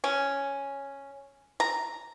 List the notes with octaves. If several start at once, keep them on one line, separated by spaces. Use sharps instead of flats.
C#4
A#5